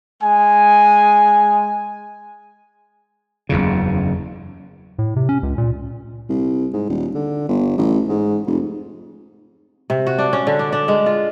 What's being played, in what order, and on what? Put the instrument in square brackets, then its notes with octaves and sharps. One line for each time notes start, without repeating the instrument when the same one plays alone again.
[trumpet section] G#3 G#5
[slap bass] F#1 E2 C#3
[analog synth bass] A2
C3
C#4
C#2
A#2
[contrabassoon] C2
G#2
D#1
D3
G1
A1
G#2
F1
[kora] C3
F#4
D4
C#4
D3
D4
D4
G#3
F4